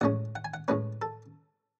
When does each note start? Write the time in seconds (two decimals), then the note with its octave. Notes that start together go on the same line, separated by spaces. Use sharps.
0.01 A1 A2 G#3 C#4 F#5
0.36 F#5
0.45 G#5
0.54 F#5
0.68 A2 G#3 C#4 B4
1.02 A4